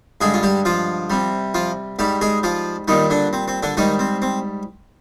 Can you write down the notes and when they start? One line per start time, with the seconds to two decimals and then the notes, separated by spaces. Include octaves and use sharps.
0.21 G2 D3 G#3 G#4
0.34 F4
0.43 G3 G4
0.65 F3 F4
1.10 C3 G3
1.54 F3 F4
1.99 G#2 G3 G4
2.21 G#3 G#4
2.43 F3 F4
2.88 A#2 D#3 G3 D#4
3.10 D3 D4
3.33 C4
3.48 C4
3.63 D3 D4
3.77 G#2 D#3 G3 D#4
3.99 C4
4.22 C4